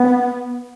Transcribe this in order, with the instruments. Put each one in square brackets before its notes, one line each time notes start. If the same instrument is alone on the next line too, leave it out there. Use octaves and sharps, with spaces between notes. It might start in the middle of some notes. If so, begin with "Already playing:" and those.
Already playing: [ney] B3